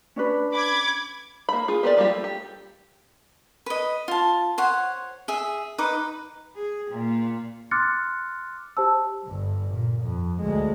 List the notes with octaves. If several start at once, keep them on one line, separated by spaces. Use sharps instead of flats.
C#4 D4 B4
B5 D6 G#6
A#3 B5
F4 G#4
B3 G4 A#4 C5 D5
F3 G3 A#3 F4 G4
A3
G4
B4 D#5
F4 A5
C5 C#5 F#5
G#4 E5
D#4 B4 D6
G#4
A#2
C6 D6 F6 F#6 A6 C#7
G4 C5 A5 E6
G1 G2
A#2
F2
D2 G#3